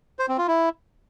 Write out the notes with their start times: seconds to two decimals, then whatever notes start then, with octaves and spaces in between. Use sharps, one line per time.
0.19 C5
0.29 C4
0.38 F4
0.48 E4